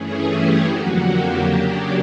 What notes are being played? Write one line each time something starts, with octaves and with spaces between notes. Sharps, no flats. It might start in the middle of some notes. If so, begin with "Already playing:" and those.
Already playing: G2 E3 A3 C#4 G#4
G4
F2 D3 F#3 A#3 F#4
G4
C#3 F#3 A#3 D4